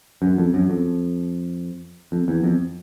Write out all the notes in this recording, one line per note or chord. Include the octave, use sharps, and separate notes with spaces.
F#2
F2
F#2
F2
F2
E2
F2